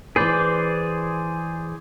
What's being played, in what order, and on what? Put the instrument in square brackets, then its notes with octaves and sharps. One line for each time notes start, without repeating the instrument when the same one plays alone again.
[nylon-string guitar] E3 B4 [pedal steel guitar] G#4 C5 D5